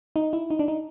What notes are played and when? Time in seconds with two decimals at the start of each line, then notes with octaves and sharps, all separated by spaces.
0.16 D#4
0.33 E4
0.50 D#4
0.59 D4
0.68 D#4